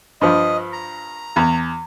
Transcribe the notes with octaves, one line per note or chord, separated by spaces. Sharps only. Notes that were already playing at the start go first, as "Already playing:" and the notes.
G2 F3 D#5
A#5
E2